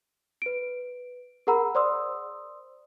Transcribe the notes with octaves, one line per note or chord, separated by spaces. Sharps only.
B4 D7
G#4 A#4 F#5 A#5 B5 E6
C5 D5 C6 D#6 E6